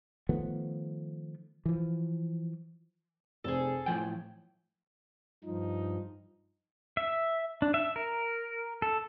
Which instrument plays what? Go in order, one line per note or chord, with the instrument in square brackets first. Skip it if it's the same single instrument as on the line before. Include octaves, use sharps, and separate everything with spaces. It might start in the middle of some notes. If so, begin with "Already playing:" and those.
[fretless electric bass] D#3 F3 A3 B3
E3 F3
[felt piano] F1 C4 [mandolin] G#4 A4
[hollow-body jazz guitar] A2 F3 G5 [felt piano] G#5
[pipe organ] G2 F3 [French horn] D#4
[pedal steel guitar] E5
D4
E5
A#4
A4